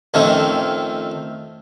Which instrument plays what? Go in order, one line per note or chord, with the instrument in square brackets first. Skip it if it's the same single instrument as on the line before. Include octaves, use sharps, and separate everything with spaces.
[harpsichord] F2 D#3 F3 A3 C#4